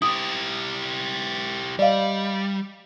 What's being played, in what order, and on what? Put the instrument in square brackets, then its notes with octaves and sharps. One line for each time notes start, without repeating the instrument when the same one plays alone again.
[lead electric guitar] E4 G4 [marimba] D#6
[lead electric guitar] G3 [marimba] D5 D#5 F5